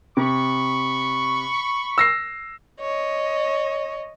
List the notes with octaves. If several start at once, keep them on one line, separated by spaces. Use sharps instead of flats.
C3 B5 C#6
E6 A#6 C7
C#5 D#5